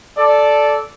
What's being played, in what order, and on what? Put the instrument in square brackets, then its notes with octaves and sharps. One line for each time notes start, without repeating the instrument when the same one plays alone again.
[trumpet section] A4 D5